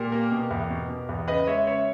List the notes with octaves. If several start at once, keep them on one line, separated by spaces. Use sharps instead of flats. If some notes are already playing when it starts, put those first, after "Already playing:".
Already playing: A#2 G4 A#4
A#3
B2
E2
B2
B2
E2
C#3 B4 D#5
G#3 C#5 E5
C#3 C#5 E5